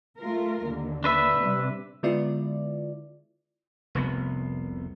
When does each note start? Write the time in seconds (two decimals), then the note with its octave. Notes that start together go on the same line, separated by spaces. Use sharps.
0.20 A3 F4 A#4
0.64 D#2 D3
1.04 D4 B4 E5
1.39 C3 G3
2.03 D3 G#3 B3 E4 F4 D5
3.95 F1 C2 B3